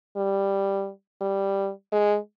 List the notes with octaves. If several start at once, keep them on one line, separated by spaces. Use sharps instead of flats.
G3
G3
G#3